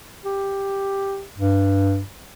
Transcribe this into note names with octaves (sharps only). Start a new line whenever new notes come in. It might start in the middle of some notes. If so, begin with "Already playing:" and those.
G4
G2